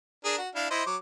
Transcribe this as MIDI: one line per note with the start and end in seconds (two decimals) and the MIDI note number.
0.25 0.38 62
0.25 0.38 68
0.25 0.38 70
0.38 0.49 66
0.55 0.68 62
0.55 0.68 64
0.55 0.68 77
0.71 0.85 64
0.71 0.85 72
0.71 0.85 75
0.86 0.97 54
0.86 0.97 86